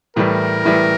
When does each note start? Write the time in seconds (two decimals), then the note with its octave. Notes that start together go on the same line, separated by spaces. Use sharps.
0.16 A2 E3 G3 A#4
0.65 A2 E3 G3